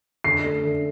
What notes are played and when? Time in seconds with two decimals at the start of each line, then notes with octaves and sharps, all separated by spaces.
0.24 D3 C7
0.44 A3
0.64 D3